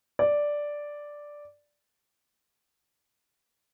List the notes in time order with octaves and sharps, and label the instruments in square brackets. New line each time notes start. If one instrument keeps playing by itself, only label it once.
[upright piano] D5